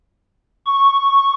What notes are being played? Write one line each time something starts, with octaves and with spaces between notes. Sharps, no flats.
C#6